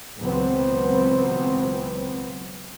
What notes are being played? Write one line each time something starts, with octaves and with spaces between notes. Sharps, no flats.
C#2 B2 E3 F#3 B3 C4